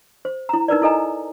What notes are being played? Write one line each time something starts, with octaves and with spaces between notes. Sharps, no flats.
C5
E4 A#5
D#4 A#4 B4 D5
E4 A4 D#5 G#5 A#5